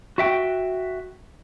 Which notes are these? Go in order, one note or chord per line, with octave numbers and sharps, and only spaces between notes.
F#4 E5 G5